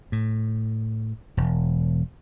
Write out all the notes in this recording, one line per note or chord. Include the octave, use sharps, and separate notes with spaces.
A2
E1